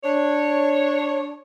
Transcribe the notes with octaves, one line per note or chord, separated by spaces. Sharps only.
D4 C#5